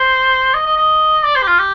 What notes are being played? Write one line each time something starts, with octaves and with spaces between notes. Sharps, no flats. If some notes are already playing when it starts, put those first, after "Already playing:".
Already playing: C5
D#5
D#5
D#5
D5
C5
G4
F4
G4